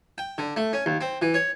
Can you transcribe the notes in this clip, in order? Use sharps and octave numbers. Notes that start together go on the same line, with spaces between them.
G5
D3
A3
C#4
D#2
C4
E3
C#5